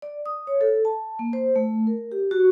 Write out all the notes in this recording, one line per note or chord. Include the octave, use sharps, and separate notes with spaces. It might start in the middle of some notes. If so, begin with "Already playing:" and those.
D5
D#6
C#5
A4
A5
A#3
C5
A3
A#4
G4
F#4